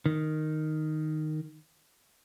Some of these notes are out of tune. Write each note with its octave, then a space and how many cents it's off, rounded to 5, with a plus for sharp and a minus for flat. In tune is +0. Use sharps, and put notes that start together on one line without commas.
D#3 -5